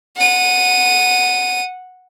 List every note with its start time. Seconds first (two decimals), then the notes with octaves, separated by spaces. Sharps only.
0.17 F#5 D#7